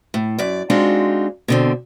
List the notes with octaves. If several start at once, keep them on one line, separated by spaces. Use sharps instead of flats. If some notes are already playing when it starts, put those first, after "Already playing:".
A2
F#2 D5
G#3 C4 D4 D#4 F4 F#4
B2 D3 C4